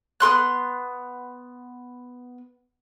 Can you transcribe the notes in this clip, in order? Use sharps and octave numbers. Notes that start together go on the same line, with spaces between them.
B3 A4 C6 F#6